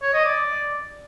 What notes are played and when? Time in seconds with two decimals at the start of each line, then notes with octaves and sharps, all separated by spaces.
0.02 C#5
0.13 D#5
0.25 D5